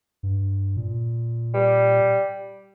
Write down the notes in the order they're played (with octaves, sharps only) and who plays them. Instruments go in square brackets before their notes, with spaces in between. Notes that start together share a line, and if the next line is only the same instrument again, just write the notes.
[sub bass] G2
A#2
[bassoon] G3